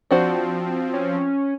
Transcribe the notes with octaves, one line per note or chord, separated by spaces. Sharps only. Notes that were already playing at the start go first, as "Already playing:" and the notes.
F3 C4 D4 F#4 C5
C#4